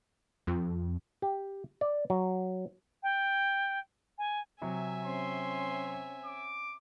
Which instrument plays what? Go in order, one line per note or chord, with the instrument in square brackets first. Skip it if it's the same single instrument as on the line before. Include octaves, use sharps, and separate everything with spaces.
[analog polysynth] F2
[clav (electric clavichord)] G4
D5
F#3
[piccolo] G5
G#5
[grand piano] C3 F#3 [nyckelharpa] E5 G#5
[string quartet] C4 C#4 [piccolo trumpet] C6
[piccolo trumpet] D6